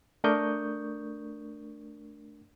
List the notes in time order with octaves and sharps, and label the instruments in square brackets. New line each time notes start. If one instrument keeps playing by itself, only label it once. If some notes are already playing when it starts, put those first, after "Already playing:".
[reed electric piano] A3 D4 A#4 C#6 D#6 G6